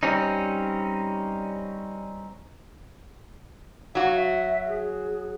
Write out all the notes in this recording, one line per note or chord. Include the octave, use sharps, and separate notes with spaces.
G3 C4 C#4 D#4
F#3 F#4 F5
E5
G#4